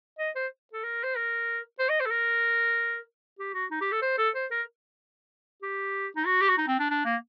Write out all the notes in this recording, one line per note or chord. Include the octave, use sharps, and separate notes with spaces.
D#5
C5
A4
A#4
C5
A#4
C5
D#5
C5
A4
A#4
G4
F#4
D#4
G4
A4
C5
A4
C5
A#4
G4
D#4
F#4
G4
F#4
D#4
C4
D4
D4
A#3